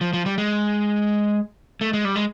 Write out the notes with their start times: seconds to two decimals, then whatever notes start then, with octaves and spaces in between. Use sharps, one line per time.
0.01 F3
0.13 F3
0.26 G3
0.38 G#3
1.81 A3
1.93 G#3
2.05 G3
2.16 G#3